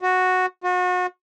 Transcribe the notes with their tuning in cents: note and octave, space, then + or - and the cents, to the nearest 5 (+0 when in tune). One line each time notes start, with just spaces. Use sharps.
F#4 -5
F#4 -35